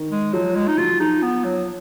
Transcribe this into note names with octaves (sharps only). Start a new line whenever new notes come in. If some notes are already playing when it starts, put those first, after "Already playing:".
Already playing: D#3
G#3
F3 F#3
G#3
D#4
F#3 F4
F3 D#4
B3
F#3